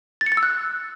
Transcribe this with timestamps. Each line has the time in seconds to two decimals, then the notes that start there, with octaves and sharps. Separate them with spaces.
0.21 A6
0.26 C#7
0.32 A6
0.37 E6
0.43 F#6